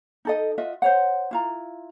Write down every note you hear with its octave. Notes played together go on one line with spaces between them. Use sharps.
D#4 A4 D#5
F4 F#4 D#5 E5
C5 C#5 F#5
E4 F4 A#5